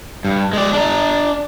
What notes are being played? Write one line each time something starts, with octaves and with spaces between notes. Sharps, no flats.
G2
G#3 D5
D4 A#5